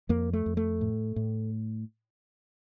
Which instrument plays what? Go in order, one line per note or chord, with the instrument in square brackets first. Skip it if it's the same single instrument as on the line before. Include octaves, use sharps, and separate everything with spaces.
[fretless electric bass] F2 A#3
A3
F2
A3
A2
A2